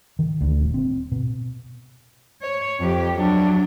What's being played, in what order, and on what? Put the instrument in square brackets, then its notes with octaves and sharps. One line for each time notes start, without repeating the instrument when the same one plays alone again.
[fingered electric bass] D#3
D2
D#1
C4
B2
[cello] C#5
F2 G4
F#3 D4